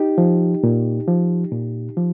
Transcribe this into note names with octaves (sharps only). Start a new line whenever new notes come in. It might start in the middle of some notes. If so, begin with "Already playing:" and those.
Already playing: D#4 G4
F3
A#2
F3
A#2
F3